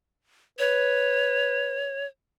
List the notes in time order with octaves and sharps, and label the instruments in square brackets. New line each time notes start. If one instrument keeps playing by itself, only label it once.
[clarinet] B4 [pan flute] C#5